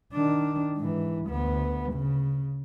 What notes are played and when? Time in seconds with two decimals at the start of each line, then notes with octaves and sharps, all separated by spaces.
0.13 D#3 D4
0.77 G#2 E3
1.26 D2 B3
1.92 C#3